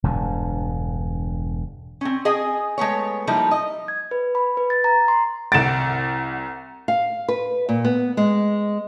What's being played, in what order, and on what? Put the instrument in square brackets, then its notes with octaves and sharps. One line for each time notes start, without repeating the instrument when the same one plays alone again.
[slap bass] E1 G2 D3
[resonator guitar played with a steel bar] C4 C#4
G#4 D#5 G5 G#5
G#3 A3 B3 C#5
F3 G3 A#3 D#4 E4
D#5
[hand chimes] G#6
B4
B5
B4
A6
A#5
C6
[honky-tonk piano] C2 F#5 D7 [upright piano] A6 E7
[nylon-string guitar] F5
B4
A#2
B3
G#3